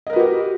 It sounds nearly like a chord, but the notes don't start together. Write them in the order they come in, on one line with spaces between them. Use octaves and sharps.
D#5 A#4 B4 F#4 G4